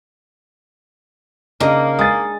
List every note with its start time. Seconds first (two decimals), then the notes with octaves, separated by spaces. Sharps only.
1.60 C#3 A#3 D4 D#4 A#4 D#5 A#5
1.99 G#3 D#6 A6